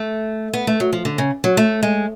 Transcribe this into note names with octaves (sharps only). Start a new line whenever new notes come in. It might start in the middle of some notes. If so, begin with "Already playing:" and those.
Already playing: A3
B3
A3
F#3
F3
D3
C#3
F#3
A3
G#3